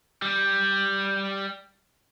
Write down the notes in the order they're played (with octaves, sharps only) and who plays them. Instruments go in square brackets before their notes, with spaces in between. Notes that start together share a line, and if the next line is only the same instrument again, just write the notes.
[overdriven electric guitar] G3